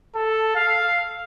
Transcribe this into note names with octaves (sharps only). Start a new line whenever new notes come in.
A4
F5